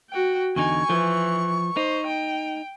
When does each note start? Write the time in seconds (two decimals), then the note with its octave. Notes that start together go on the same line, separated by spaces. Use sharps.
0.10 F#4 G5
0.56 E2 D3 D#4 G#5 C#6
0.90 E3 F3
1.77 D#4 C5
2.07 G5